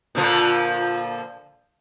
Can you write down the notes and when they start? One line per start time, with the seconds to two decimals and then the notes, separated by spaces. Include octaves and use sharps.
0.15 A#2 D3 F3